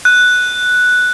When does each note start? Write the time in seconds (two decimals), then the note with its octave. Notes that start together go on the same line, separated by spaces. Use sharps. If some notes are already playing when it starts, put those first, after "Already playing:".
0.05 F#6